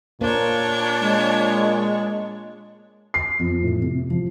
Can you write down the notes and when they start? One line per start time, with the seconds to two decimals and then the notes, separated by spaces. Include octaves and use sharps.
0.21 A#2 A#3 D4 A#4 C5 C#5
1.00 G#3
3.14 C7
3.39 F2
3.63 A2
3.82 C3
4.10 F3